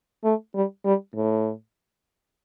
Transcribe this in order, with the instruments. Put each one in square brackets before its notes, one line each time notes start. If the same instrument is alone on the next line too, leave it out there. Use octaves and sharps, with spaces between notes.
[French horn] A3
G3
G3
A2